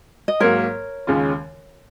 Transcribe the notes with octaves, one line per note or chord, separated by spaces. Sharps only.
D#5
G#2 F#3 A#3 A#4 C#5
D#2 C#3 G#3 C#4 F4